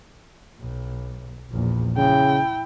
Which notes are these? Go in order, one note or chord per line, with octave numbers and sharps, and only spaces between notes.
B1
A#1 E2
C#3 E4 G5